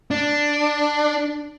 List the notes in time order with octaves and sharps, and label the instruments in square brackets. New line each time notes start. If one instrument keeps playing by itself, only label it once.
[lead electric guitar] D4